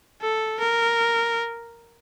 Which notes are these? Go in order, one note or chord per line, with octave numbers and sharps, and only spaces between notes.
A4
A#4